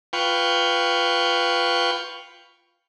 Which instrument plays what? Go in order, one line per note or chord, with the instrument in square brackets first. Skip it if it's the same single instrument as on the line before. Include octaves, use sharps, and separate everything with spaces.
[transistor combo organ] F4 B4 G5 C#6